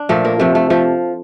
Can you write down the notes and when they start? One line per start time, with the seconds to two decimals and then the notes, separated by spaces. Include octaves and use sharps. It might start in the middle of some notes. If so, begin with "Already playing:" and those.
Already playing: D4
0.09 A#2 F3 A3
0.25 A#3
0.40 C3 F3 A3
0.55 A3
0.70 F3 A3